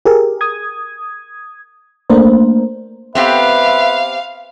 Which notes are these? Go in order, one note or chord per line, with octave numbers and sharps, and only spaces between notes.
G4 G#4 A#4
D#6 G#6
A3 A#3 D4 A#4 C5
B3 C4 G4 B4 E5 F5